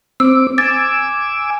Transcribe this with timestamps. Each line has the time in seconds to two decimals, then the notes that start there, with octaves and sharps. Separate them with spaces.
0.20 C4 D6 E6
0.58 G#5 D6 E6 A6